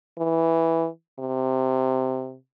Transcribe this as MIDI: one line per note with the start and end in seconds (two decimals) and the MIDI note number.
0.18 0.87 52
1.19 2.36 48